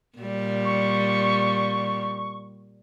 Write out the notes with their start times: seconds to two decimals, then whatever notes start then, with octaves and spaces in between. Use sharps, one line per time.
0.18 A#2 G3
0.65 C#6